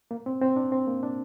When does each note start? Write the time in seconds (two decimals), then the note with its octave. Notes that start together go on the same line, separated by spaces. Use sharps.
0.11 A#3
0.26 C4
0.42 C4
0.56 D4
0.72 C4
0.87 A#3
1.03 D4